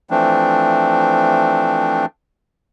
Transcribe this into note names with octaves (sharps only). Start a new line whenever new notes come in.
E3 F3 A3 C4 D4